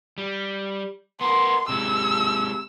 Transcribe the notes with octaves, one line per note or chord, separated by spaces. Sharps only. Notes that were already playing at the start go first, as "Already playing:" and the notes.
G3
B3 A#4 C6
C3 G#3 E6